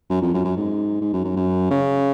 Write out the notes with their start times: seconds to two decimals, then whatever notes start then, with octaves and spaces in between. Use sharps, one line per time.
0.10 F#2
0.22 F2
0.34 F#2
0.44 F#2
0.57 G#2
1.01 G#2
1.13 F#2
1.24 F#2
1.36 F#2
1.70 C#3